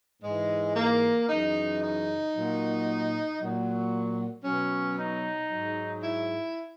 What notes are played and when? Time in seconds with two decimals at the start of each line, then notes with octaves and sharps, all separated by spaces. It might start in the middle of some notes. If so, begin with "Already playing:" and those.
0.22 G#2 E3 G#3
0.75 A#3
1.28 F#2 C#3 E3 D#4
1.81 D#4
2.33 A#2 F#3
3.39 A#2 F#3
4.44 B2 F#3 C#4
4.97 D#4
5.50 G#2 F#3
6.03 E4